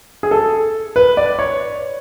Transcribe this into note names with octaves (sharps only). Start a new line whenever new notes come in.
G#4
A4
B4
D5
C#5